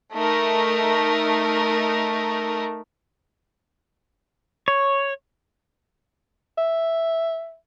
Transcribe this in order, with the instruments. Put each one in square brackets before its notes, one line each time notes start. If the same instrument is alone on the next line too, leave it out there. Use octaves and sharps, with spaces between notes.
[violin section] A3 D#4 A#4
[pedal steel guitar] C#5
[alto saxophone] E5